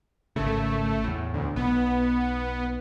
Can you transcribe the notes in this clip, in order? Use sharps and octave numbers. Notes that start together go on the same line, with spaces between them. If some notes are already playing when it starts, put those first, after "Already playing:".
G#1 C#3 A3
E2 A2
D2
B1 B3